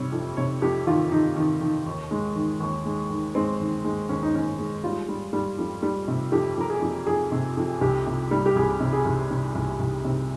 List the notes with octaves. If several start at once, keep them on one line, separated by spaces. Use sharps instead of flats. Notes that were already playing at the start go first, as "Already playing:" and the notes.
Already playing: C3 G3 C#5
F2
C3 C#5
F2 G4
D#3 F4
D#3 D#4
D#3
D#3
D#2
G#3
D#3
D#2
G#3
D#3
G#3 C4
D#3
G#3
D#2 C#4
D#4
D#2 C#4
G#3
G3 F4
G3
G3
F2
G3
C3
F2 G4
F2 A#4
G#4
F2
F2 G#4
C3
F2
C2 G4
C3
G3
G4
C2 G#4
C3
G#4
C2
C3
C2
C2
C3